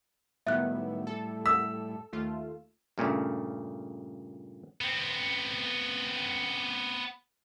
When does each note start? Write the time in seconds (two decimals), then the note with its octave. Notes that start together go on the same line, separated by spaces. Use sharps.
0.47 A2 D#3 F#3 G3 B3 E4 E5 F#6
1.07 A4
1.46 D#6 E6 B6
2.13 D#2 A3 F4
2.98 G2 A#2 C#3 A3
4.81 B3 C4